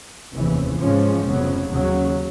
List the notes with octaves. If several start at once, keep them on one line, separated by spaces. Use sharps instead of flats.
F1 D#2 C#3 E3
G#2 F3 G#3 C#4
F1 F2 C#3 F#3 B3
D#2 C#3 F#3